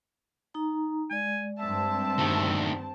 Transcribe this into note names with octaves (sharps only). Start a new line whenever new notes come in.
D#4 A#5
G#3 D5 G#5
G2 C4 E5 A5
D2 D#3